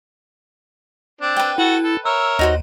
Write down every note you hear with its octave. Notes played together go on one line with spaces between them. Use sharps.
C4 D4
B4 G5
E4 F#4 A4 F#5
A4
A#4 C#5 E5 E6
D#2 D#4 F#4 C5